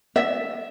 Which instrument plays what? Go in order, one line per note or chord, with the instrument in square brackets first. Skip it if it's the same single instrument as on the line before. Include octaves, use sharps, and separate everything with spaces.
[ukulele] E5